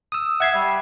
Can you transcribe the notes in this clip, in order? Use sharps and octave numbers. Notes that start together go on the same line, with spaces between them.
D#6 E6
E5 F#5 G#6 C7
G3